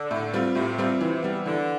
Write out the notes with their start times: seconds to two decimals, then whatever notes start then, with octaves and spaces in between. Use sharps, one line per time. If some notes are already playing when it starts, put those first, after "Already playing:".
Already playing: D3
0.11 A2
0.34 G3 C4 F4
0.55 A2 C3
0.78 G3 C4 F4
1.01 C3 E3
1.23 G3 B3
1.46 D3 E3